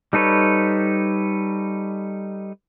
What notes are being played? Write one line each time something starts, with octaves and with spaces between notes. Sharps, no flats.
G3 D#4 A4 B4 C#5